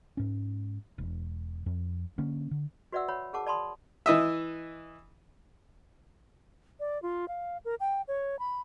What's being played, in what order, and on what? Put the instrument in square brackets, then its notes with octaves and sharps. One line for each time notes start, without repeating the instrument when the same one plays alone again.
[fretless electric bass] G#2 C#4
E1
F2
D3 A#3 C#4
D3
[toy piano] F#4 B4 D5 E5 F#5 E6
C#5 F#5 B5
G#4 A#4 F#5 A5 D6
D5 A5 B5 C6 D#6
[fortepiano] E3 D#5 E5
[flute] D5
F4
F5
A#4
G5
C#5
B5